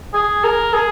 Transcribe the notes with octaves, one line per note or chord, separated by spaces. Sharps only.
G#4
A#4
G#4